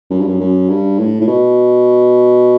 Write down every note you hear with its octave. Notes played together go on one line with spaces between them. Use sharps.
F#2
G2
F#2
F#2
G2
A2
A2
B2